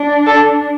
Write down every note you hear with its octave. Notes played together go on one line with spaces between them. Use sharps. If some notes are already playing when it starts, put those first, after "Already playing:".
Already playing: D4
A4